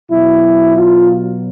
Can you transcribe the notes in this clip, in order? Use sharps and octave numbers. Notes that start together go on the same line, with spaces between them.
B2 F#3 E4
F4